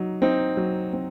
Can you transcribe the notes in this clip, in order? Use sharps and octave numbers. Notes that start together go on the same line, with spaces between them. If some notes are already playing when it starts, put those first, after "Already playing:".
Already playing: F#3 D#4
C4 D#4
F#3
C4